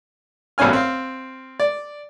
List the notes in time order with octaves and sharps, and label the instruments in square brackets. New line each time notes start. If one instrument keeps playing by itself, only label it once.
[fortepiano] A1 G2 B2 C#4 G#5 F6
C4 F5
D5